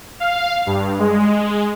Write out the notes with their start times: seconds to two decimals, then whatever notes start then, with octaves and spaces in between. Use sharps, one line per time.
0.20 F5
0.66 G2
0.99 G#3